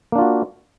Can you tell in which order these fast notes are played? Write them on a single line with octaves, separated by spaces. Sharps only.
A#3 D4 F4 F#4